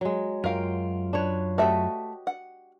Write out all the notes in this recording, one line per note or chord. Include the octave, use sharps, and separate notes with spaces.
F#3 G#3
F#2 F4 A#4 F5 G5
D4 B4 C#5
A3 F#4 G4 D#5 E5
F#5